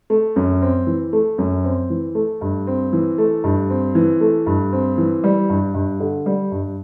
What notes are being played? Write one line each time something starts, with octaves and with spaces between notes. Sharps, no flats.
A3
F#2
C4
E3
A3
F#2
C4
E3
A3
G2
C4
E3
A3
G2
C4
E3
A3
G2
C4
E3
G3
G2
G2
D3
G3
G2